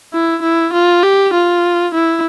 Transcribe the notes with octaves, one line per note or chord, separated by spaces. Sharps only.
E4
E4
F4
G4
F4
E4